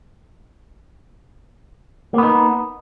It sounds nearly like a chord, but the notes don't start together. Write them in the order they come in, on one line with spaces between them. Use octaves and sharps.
A#3 B3 D#4